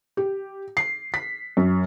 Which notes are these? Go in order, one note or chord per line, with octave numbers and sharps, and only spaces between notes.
G4
C7
B6
F#2